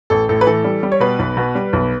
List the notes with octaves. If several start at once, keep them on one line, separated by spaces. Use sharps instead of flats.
A1 A4
A2 A4
B4
E3 A4
G3
G3
C#5
B2 B4
B1
B2
G3
B1